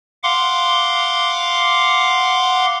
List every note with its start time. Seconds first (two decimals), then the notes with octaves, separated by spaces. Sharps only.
0.24 F5 F#5 C6 D6